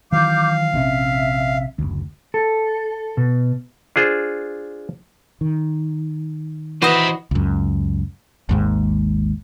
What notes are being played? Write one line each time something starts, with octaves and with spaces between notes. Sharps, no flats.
D#3 E3 F#3 F5 D6 G6
A#1 C3 C#4 E5
F#1 D2
A4
B2
D4 F4 G#4 C5
D#3
E3 F#4 B4 C5 D#5 E5
C#2 F#2
G#1 D#2 G#2